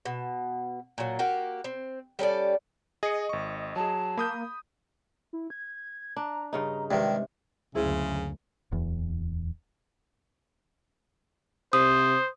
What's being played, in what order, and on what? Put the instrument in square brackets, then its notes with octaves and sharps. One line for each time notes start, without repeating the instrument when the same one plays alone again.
[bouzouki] B2
A#2 F#3
A#3 F#4 G4
C4
G3 C#4 A4 D5
[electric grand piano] G#4 C#7 [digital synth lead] D#5
[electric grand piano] G#1 C#6
[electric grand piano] F#3 G#4 [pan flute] A5
[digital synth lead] A#3 [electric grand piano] B5 D#6 G6
[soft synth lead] E4
G#6
[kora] D4 [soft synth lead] A#5
[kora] G2 C#3 D#4 [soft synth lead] A#5
[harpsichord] G2 D#3 [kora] C3 [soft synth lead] G#3
[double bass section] F#1 D2 [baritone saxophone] C#3 [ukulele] E4 G#4 C5
[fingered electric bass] D1 E2 E3
[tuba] C3 [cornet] C5 [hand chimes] D#6